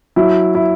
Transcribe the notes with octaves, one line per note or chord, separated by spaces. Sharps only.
F#3 E4
E4